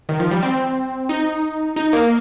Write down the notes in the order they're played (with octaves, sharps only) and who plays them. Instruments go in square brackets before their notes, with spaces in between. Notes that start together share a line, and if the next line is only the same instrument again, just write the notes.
[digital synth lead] D#3
F3
G3
C4
D#4
D#4
A#3